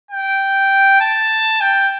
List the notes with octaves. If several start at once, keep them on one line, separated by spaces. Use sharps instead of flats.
G5
A5
G5